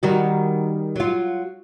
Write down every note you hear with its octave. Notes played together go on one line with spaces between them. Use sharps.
D#3 G3 F#4
F#3 F4